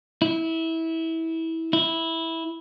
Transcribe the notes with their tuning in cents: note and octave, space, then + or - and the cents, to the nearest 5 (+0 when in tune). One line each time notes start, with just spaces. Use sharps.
E4 -20
E4 -10